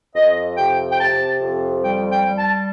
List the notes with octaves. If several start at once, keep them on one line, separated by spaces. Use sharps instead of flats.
F2 D#5
C3 G5
G5
C3 A5
F2
G3 G5
G5
G3
A5